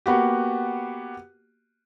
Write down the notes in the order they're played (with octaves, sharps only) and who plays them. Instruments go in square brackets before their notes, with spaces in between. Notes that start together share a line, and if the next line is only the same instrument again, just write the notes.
[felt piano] A#3 B3 F#4 G4